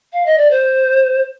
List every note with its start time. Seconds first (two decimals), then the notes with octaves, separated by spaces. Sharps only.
0.12 F5
0.25 D#5
0.37 D5
0.50 C5